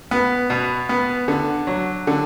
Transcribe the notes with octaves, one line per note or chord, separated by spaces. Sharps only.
B3
B2
B3
D3
F#3
D3